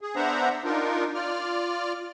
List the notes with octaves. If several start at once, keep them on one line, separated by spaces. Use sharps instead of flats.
G#4
B3 D4 C5 E5 F#5 A#5
D4 D#4 F4 A#4
F4 D5 F6